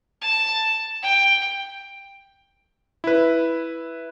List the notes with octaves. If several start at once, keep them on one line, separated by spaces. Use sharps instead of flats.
A5
G5
E4 B4